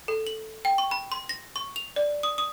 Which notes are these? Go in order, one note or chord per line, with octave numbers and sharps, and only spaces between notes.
A4
F#7
G5
C#6
B5
C6
A#6
C#6
F7
D5
D#6
D#6